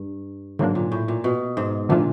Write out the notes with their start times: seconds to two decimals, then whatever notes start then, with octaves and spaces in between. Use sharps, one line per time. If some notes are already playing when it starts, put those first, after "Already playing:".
Already playing: G2
0.59 G#2 D3 F#3 A#3 D4
0.75 A#2
0.92 A2
1.08 A#2
1.24 B2
1.57 G#2
1.89 A#2 D3 F3 A3 D4 F4